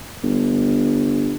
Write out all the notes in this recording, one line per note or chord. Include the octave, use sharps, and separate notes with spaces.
G1